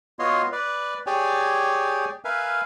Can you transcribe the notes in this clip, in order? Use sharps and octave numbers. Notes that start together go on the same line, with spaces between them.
B3 F4 F#4 C#5 D#5 C6
B4 D5
G4 G#4 C#5 D5 G5 G#5
A#4 B4 E5 F5 G#5